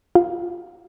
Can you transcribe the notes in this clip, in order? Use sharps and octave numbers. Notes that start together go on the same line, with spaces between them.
F4